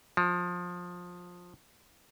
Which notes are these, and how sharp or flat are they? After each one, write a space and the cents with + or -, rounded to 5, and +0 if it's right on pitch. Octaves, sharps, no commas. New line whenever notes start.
F3 +20